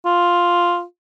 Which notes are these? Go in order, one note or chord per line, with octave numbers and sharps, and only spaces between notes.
F4